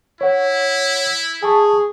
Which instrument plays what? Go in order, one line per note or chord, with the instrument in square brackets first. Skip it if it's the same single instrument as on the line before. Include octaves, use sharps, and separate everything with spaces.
[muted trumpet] E4 [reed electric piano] C#5 F#5
[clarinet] G#4 [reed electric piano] G#5 A5 C#6